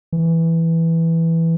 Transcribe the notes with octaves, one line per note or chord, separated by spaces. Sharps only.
E3